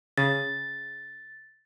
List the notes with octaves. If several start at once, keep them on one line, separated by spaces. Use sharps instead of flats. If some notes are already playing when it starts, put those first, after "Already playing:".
C#3 A6